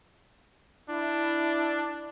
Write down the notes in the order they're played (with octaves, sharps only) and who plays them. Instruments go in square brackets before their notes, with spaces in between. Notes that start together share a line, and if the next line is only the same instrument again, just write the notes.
[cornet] D4 [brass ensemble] E4